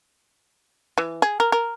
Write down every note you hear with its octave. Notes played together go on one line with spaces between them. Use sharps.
E3
G#4
A#4
A#4